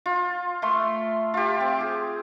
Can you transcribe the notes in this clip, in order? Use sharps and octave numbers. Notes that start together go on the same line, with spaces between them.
F4
A3 C6
F4 G4
C4
G#4